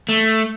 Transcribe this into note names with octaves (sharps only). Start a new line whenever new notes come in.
A3